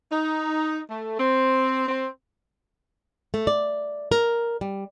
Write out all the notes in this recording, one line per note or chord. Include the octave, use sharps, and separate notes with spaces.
D#4
A3
C4
C4
A3
D5
A#4
G3